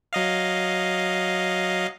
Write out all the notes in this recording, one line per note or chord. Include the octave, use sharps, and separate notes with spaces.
F#3 D#5 F5